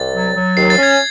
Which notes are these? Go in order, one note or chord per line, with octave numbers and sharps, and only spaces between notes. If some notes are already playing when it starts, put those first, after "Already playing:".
Already playing: C2 A6
F#3
F#3
D#2 C7
A6
C#4 G#6